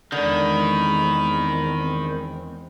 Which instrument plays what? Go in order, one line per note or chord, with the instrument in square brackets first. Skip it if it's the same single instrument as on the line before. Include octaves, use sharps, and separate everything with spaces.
[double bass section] E2 G#3 C4 [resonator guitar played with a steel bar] D3 [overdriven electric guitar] D#3 [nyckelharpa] B5